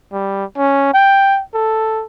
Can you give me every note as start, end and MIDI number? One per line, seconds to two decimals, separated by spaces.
0.12 0.45 55
0.57 0.93 61
0.94 1.42 79
1.54 2.05 69